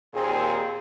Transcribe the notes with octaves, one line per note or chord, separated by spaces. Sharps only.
D#2 A#2 C4 G#4